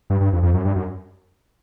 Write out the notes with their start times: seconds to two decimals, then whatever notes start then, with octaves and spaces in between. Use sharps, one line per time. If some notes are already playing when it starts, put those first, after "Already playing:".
0.10 G2
0.21 G2
0.33 F2
0.43 F2
0.54 F#2
0.65 G2
0.76 F#2